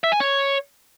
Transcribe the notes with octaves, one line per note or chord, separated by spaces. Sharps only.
E5
G#5
C#5